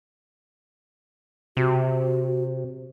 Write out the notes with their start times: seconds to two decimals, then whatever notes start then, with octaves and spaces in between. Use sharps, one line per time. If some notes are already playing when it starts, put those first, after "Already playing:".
1.57 C3 F#4